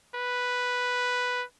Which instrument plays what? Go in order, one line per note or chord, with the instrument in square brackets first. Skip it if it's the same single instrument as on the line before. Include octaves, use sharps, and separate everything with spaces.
[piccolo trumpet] B4